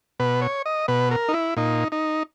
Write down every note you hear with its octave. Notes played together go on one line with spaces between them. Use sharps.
B2 B4
C#5
D#5
B2 B4
A#4
D#4
E4
A#2 D#4
D#4